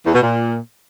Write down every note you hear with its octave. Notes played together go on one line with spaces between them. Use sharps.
E2
B2
A#2